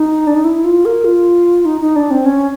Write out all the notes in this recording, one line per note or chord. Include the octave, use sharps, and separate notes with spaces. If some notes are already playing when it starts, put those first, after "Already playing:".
Already playing: D#4
D4
D#4
E4
F4
A#4
F4
D#4
D#4
D4
C4
C#4